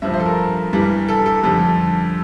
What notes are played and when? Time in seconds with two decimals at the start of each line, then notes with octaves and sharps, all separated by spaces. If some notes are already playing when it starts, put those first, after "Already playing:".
0.02 G2 F3 E5
0.14 C5
0.20 A4
0.26 A#4
0.73 G2 E3 G3
1.09 A4
1.26 A4
1.44 F2 D3 G3